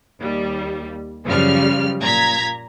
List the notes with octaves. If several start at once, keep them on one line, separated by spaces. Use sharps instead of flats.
D#2 G3
F#2 C#3 F3 G3 F6
A#2 A#5 G#6 B6